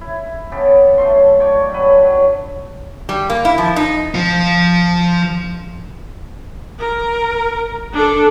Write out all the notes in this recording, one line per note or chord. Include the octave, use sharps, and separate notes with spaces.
E4
C#3 B3 G4 A4
F#2 A3 C6
C#5 D5 G5 C#6
G2 F#3 B4
F#3
G3
A#3
E4
F3
D#4
F3 F4
A#4
D4 A4